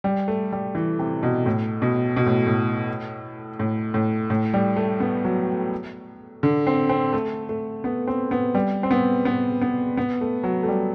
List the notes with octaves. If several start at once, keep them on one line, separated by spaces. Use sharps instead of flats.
G3
A3
G3
E3
C3
B2
A2
B2
B2
A2
A2
A2
A2
A2
G3
A3
B3
F#3
D3
C4
C4
A3
A3
B3
C4
B3
G3
C4
B3
B3
B3
B3
A3
F#3
A3
G3